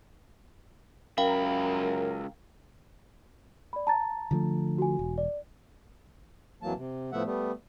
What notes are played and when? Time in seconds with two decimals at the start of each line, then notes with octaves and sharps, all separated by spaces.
1.18 C#2 F#2 A#4 F5 G5 B5
3.73 D5 B5
3.87 A5 A#5 A6
4.31 D3 F3 A3
4.78 F#4 G#5
4.99 E1
5.18 D5
6.62 F2 E3 F#3 A#3 A5
6.76 C3
7.12 A2 F3 A3 B3 E5 F#5
7.24 G3 A3 B3